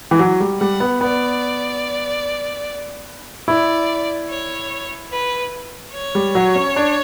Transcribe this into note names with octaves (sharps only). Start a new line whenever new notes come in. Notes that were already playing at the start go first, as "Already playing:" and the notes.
E3
F#3
G3
G3 F#5
B3
B3 D5
E4 D5
C#5
B4
C#5
G3
F#3
C#4
D4